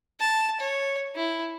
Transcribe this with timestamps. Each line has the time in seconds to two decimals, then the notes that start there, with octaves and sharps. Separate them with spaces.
0.20 A5
0.60 C#5
1.15 E4